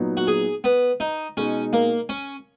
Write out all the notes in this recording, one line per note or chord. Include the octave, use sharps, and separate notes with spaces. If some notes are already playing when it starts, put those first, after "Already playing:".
Already playing: A#2 F#3 B3 D#4
F#4
G#4
B3
D#4
B2 G#3 C#4 D#4
A#3
C#4